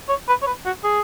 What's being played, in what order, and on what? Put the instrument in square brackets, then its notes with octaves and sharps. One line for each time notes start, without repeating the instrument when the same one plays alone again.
[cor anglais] C#5
B4
C#5
B4
F#4
G#4